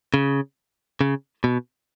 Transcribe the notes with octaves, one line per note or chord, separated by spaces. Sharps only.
C#3
C#3
B2